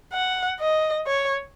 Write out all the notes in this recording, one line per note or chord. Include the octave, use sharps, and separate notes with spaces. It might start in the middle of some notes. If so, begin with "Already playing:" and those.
F#5
D#5
C#5